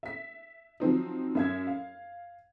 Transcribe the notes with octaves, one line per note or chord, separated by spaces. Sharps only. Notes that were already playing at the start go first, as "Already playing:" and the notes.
E5 B6
F3 F#3 C4 D#4
F#2 E5 G#6
F5